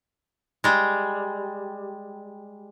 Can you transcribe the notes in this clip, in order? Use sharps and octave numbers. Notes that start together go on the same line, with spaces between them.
G3 G#3